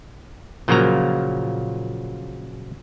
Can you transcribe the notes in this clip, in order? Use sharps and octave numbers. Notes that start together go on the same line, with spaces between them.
A#2 C#3 F3 F#3 A#3 A#5